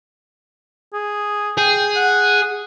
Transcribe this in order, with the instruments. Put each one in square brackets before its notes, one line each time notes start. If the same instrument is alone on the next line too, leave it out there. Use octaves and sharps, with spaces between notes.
[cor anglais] G#4
[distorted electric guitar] G#4 [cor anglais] G5
[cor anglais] F#5